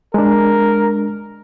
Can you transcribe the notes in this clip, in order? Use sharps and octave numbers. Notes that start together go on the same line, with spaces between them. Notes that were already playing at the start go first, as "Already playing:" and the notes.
G#3 D4 A#4